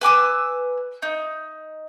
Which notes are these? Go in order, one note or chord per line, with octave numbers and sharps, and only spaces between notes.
B4 G#5 D6 E6
D#4